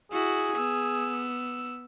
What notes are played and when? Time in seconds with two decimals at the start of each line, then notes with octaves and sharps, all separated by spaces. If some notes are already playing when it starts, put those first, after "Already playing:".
0.12 E4 F#4 G#4
0.57 B3 E6